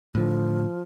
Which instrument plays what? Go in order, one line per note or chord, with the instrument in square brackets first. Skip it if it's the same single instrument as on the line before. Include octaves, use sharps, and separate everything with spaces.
[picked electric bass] A2 D3 [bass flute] F3